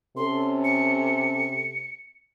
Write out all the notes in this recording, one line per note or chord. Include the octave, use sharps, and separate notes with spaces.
C3 C#4 A4 C6
C#7